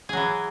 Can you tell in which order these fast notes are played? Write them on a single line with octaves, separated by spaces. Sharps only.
G#4 F#3 E3